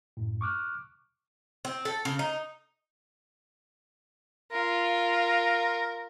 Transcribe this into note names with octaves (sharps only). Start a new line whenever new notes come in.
F#2 A2
C#6 D6 F6 F#6
C4
A4
C#3
D#4
F4 A#4